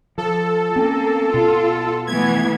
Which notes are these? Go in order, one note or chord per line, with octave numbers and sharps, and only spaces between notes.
F3 A4
A#3 C4 C#4
B2 F4
E3 A3 B3 G#6